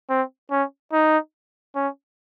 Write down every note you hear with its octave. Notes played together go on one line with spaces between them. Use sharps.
C4
C#4
D#4
C#4